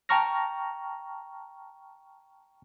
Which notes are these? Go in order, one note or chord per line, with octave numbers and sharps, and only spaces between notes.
G5 A5 A#5 C#6 F6 A#6